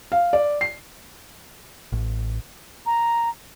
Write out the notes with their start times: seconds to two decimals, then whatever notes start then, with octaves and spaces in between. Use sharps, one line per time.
0.12 F5
0.33 D5
0.61 C7
1.92 A1
2.86 A#5